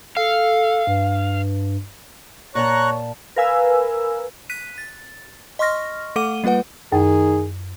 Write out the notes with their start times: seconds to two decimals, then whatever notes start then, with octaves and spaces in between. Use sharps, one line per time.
0.17 A4 F5
0.87 G2
2.55 A#2 C#5 A5 A#5 C#6 F#6
3.36 A#4 B4 F5 G#5 E6
4.50 F#6 B6 D#7
4.78 A6
5.59 D#5 C6 C#6 F6 A#6
6.16 A3 A4 F#5 D6 D#7 G7
6.44 G3 A#3 F4 B4 F#5
6.92 F#2 D#3 G#4